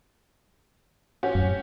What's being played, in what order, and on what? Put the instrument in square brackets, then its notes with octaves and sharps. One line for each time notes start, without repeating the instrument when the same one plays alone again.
[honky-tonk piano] C#4 F#4 G4
[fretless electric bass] D1 F#2 F#3